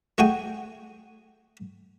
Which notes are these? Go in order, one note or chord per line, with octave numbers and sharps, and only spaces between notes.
A3 F#4 G#4 G5 G#5